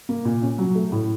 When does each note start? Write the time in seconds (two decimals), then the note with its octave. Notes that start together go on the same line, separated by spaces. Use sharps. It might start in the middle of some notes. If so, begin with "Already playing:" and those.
0.09 A#3
0.25 A#2
0.42 C#4
0.58 F#3
0.75 A3
0.92 A2